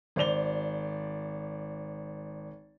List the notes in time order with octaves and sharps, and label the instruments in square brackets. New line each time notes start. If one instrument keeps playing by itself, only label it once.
[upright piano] G#1 C5 D5 F7 G7